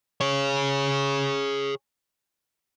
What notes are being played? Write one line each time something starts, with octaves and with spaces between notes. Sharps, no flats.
G#4 C#5